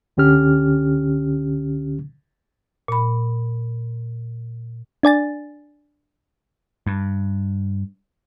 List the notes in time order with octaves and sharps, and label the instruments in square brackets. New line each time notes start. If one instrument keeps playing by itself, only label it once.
[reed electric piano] C#2 D3 C#4 G4 F6
[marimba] A#2 B5
[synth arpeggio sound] D4 D5 G#5 A6
[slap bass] G2